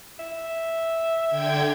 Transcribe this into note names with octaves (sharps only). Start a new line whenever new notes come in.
E5
D3 G5 G#6